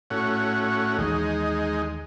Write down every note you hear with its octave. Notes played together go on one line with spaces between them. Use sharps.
A2 C#4 F#4
D#2 E3 G#3 D#4